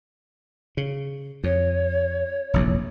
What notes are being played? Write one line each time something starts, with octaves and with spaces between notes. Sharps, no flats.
C#3
F2 C#5
F1 A#1 E2